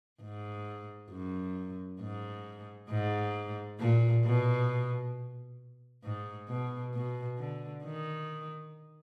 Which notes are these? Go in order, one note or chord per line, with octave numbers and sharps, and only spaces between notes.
G#2
F#2
G#2
G#2
A#2
B2
G#2
B2
B2
D3
D#3